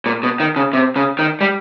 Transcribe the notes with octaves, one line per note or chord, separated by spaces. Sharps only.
A#2
B2
D#3
C#3
C3
C#3
D#3
G3